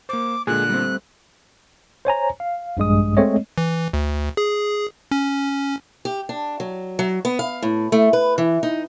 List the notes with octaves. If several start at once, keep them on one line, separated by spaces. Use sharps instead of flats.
A#3 C5 D6
A#2 D3 G#3 G#4 F#6
G3 A3 C4
C5 C#5 G#5 A#5
F5
A#1 G2 G#3 D#6
G#3 A3 C4 C#5 D#5
E3
D2
G#4
C#4
G4
D4
F#3
F#3
B3
F5
A2
A3
B4
E3
D#4